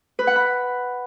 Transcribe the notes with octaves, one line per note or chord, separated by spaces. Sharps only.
B4
F#5
B5